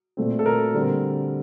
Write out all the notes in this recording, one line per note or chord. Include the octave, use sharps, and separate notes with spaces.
A#2 A3 C4
A4
A#4
D3 G3 C4